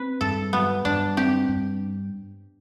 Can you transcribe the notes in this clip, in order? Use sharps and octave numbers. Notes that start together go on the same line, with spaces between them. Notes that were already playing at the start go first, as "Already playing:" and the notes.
Already playing: C4 B4
G2 A4
F#3 B3
G2 D4
C4 G4
G2